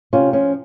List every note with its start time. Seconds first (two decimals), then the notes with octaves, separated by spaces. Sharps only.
0.13 C3 C#4 F4
0.33 F3 C#4